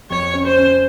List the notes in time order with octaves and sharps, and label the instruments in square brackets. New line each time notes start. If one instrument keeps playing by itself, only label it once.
[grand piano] F2 [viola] C#5
[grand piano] C#4
[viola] C5
[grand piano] C#4